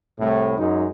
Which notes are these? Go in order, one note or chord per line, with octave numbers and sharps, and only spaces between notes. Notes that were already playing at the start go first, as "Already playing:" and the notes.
C2 A2
F#2 G#3 D#4